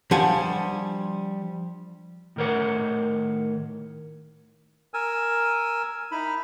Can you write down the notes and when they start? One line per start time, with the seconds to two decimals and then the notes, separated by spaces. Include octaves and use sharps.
0.11 F3 G3 D4 F#5 G#5
2.36 A2 D#3 A#4 C#5 F#5
4.94 A#4 G#5 E6
6.12 D#4 E4 B5